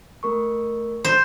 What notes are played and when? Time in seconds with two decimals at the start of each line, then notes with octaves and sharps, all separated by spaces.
0.23 A3 A#4 C#6
1.04 C5